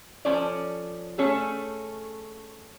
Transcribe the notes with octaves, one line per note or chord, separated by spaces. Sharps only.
F3 C#4 A4 C#5 D5
A3 C#4 G#4 A4